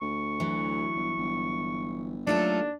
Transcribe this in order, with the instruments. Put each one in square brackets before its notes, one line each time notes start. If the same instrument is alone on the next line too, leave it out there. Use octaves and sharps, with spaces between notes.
[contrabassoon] D2 [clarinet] C#6
[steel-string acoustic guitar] E3 F#3
[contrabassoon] G1
G1
[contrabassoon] D#2 [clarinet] F#3 [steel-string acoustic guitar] A3 F4 A4 [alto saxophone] D4